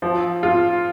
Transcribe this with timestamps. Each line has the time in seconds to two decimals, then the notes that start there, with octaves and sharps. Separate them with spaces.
0.02 F3
0.43 F4